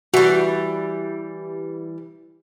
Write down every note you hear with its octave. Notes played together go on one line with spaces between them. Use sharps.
E3 G3 F#4